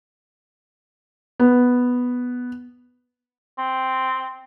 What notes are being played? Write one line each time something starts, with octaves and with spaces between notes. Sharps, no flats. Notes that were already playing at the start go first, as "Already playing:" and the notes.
B3
C4